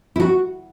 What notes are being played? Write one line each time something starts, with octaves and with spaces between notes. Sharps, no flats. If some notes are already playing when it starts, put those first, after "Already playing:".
E4
F#4